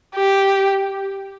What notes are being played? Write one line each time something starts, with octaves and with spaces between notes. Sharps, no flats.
G4